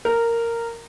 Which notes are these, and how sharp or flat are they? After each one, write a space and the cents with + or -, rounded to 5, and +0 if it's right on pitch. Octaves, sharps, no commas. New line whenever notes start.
A#4 -10